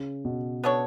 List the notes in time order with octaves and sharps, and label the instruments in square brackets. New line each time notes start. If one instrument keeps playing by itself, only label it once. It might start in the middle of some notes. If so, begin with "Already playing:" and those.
Already playing: [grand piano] C#3
B2
[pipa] B3 D4 A4 C#5